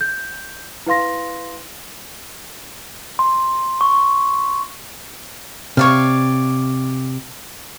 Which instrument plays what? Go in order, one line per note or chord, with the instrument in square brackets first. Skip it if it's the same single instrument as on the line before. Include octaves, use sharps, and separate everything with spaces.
[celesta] G6
E4 B4 F5 C6 A#6
[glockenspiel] C6
C#6
[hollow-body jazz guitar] C3 [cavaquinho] C#5 D5 F5